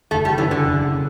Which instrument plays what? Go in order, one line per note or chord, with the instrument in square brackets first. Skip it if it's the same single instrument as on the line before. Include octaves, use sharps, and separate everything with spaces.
[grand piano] F#1 [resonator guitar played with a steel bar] A3
[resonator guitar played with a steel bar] G3
[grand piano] F#2 C#3 F#3 [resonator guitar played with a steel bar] E3
[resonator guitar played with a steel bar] D3
[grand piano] F#1
C#3